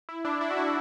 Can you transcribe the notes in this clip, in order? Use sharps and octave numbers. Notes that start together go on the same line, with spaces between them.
E4
D4
E4
F#4
E4